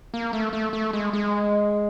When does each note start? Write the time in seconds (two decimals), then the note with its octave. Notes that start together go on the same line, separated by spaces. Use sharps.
0.14 A#3
0.33 A3
0.53 A3
0.73 A3
0.93 G#3
1.13 G#3